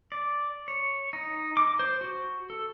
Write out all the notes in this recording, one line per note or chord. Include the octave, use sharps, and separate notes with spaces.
D5
C#5
D#4
D6
C5
F#4
A4